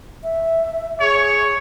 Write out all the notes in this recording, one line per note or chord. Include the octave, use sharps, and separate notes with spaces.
E5
G#4 C#5